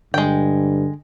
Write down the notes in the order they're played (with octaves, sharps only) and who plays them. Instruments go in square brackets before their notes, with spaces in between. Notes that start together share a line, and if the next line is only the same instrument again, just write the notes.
[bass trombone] G2 [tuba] D3 [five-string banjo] G#3 G5